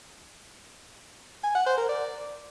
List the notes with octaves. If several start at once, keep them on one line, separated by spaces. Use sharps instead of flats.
G#5
F#5
C5
A#4
D5